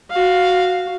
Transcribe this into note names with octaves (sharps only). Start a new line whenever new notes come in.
F#4 F5